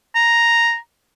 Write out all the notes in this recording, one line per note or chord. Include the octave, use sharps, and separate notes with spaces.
A#5